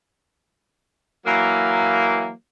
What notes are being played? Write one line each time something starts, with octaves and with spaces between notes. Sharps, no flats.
E3 F#3 A#3